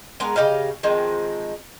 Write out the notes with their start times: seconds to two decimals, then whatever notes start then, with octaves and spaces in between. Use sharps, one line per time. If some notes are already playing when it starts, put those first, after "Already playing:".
0.20 G#3 B3 A#4 B4
0.36 C#3 G4 D#5 F5
0.83 D#3 F3 G#3 C4